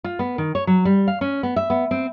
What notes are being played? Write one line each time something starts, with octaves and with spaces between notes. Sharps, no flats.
F4
B3
D#3
C#5
F#3
G3
F5
C#4
B3
E5
B3
C4